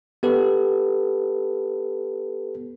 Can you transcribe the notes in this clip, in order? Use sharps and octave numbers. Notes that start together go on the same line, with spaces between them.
B3 G4 A4 B4